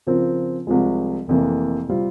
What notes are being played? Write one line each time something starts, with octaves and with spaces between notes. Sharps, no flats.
C#3 F3 C4 F4 A#4
C2 C3 F3 G#3
F1 F2 E3 A#3
C3 G3 C4 F4